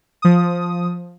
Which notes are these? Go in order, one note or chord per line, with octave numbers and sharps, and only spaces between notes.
F3 D#6